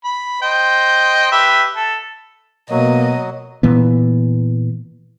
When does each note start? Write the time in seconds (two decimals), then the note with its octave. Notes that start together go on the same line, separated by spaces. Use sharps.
0.04 B5
0.41 C5 D#5 G5
1.32 G4 B4 E5
1.76 A4
2.71 B2 F#3 A#3 D#5
3.63 A#2 E3 B3